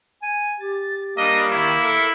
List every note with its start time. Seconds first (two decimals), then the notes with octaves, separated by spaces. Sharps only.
0.22 G#5
0.60 G4 A6
1.17 G3 A#3 D4 D#5
1.52 D#3 E4
1.81 A4 A#4 E5